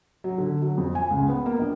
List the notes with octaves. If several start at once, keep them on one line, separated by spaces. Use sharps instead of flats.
F#3
D3
F#3
F2
G#5
C#2
B3
A#3
A#1